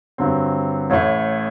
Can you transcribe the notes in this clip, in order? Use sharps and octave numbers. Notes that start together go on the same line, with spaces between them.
G2 D3 F#3 C4
A1 A2 A3